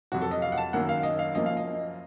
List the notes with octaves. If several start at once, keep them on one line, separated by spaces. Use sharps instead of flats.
F2 C3 F#3 F#4
A4
D#5
F5
F#5
A5
F#1 F#2 D#3 F#3 A#3 F#5
F5
D#5
F5
F#1 F#2 F3 A#3 D#5
F5
D#5